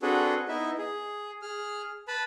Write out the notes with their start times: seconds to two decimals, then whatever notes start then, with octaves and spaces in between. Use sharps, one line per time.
0.02 C4 D4 F#4 G#4 A4 B4
0.48 B3 D#4 E4 D#5 E5
0.78 G#4
1.42 G#4 F6
2.08 B4 A5 B5